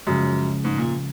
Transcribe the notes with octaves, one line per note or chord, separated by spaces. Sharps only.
C#2 F#2 C#3 F3 G#3
G#2
A#2